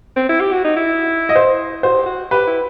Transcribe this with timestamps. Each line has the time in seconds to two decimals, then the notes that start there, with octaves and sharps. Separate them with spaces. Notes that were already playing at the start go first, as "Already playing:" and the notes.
0.16 C4
0.29 E4
0.40 G4
0.52 F#4
0.64 D#4
0.77 E4
1.29 D#5
1.36 C5
1.83 F#4 C5
1.95 G4
2.06 F#4
2.31 G4 B4
2.47 E4